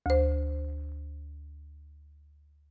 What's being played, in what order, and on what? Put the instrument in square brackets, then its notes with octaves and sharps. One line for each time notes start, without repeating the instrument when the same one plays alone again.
[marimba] D2 C5